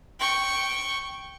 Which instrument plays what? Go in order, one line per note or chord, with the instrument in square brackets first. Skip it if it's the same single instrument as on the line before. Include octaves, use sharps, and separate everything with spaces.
[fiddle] G5 C#6